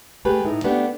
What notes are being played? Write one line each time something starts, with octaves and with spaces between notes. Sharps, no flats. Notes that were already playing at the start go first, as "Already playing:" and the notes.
A3 G4 G#4 B4
A2 D#4
A3 B3 D4 G4